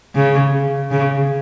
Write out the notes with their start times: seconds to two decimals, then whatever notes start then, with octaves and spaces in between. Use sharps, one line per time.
0.15 C#3
0.91 C#3